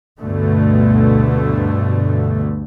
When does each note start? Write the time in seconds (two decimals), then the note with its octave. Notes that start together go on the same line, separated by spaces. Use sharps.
0.19 D2 G2 B2 D3 A3